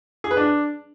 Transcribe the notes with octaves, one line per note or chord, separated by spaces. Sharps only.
G#4
B4
D4